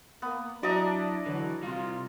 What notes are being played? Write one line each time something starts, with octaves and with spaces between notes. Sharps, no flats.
A#3 B3
F#3 D4 E4 F#4 D5 D#5 A#5
D3 E3 F#3
C3 G3 F4